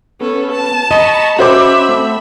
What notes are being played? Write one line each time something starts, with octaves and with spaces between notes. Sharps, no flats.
B3 C#4 A4
A5
D#5 A#5 B5 C#6
C#4 F#4 C5 E5 B5 D6
A3 C4